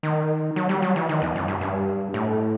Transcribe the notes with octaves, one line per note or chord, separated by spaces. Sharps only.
D#3
F#3
G3
F#3
E3
D#3
E2
F#2
G2
G2
A2